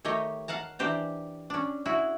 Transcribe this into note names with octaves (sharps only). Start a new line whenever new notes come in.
D#3 A3 G4 C#5 D#5
F5 F#5 A5 A#5
E3 D4 G4 C5 A#5
C#4 D4
E4 F#4 G#4